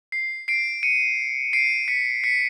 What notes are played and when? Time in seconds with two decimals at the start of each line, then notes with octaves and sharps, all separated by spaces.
0.12 C7
0.48 C7 D7
0.83 C#7 D#7
1.53 C7 D7
1.88 B6 C#7
2.24 B6 C#7